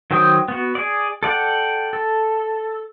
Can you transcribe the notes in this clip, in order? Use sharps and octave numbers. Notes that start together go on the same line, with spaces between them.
D#3 F#3 C5 G5 D#6
B3 F#4
G#4 D5
A4 D5 F#5 G5
A4